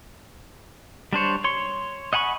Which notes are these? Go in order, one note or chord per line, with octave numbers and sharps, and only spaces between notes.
G3 D4 C5 C#5
C#5 C6 C#6
D#5 F#5 G#5 B5 C#6